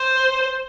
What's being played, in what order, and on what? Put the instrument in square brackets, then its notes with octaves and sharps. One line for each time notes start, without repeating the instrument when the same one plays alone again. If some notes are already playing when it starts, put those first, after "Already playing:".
Already playing: [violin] C5